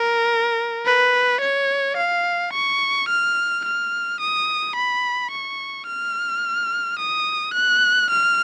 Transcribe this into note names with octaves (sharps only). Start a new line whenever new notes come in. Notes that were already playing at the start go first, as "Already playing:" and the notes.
Already playing: A#4
B4
C#5
F5
C#6
F6
F6
D#6
B5
C#6
F6
D#6
F#6
F6